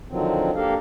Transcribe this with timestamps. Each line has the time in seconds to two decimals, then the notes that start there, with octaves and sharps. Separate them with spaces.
0.09 D3 D#3 F3 F#3 C4
0.55 A#3 D4 G4 A4 A#4 F5